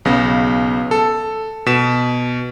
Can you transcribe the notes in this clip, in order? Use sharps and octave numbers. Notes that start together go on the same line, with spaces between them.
B1 C#3 B3 A#6
A4
B2 B6 E7